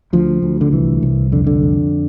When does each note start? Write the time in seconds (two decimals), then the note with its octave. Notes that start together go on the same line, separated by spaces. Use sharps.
0.13 D2 F3
0.43 D2
0.61 D3
0.73 C2 E3
1.03 C2
1.32 F2 D3
1.47 D3
1.62 F2